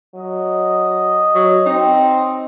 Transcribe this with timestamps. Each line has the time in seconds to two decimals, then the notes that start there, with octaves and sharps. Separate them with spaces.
0.15 F#3 D#5
1.35 F#3 C#5
1.66 C4 D#4